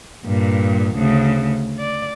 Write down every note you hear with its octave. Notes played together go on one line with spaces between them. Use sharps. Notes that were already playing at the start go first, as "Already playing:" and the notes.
G2 A#2
D2 C#3
D5